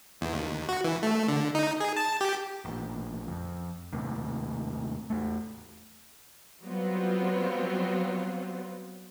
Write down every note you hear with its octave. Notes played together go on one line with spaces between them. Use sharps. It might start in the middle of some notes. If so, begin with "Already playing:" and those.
E2
D#2
F#4
E3
A3
D3
D#4
G#4
A5
G4
A1 A#2
F2
D#2 A2 C3
E2 A3
F#3 G3 B3 C4 F4